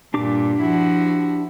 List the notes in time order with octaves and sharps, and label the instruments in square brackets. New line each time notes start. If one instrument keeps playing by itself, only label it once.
[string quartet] G2 A#2 [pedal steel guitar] D4 G4 D6
[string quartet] F3 E4 F#4